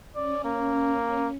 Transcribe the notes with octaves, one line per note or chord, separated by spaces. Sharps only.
C#4 D5
A#3